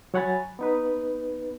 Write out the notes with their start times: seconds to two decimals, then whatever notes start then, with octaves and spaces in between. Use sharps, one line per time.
0.14 F#3 C#5 F#5 G#5 B5 A6
0.59 B3 D#4 B4